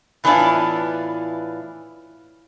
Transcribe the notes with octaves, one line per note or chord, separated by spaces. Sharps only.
A2 E3 B3 D4 E4 F4